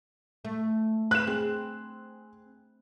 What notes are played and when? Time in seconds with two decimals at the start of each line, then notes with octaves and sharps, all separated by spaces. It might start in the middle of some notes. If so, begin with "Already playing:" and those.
0.45 A3
1.11 B4 F#6 E7
1.27 C4 G#4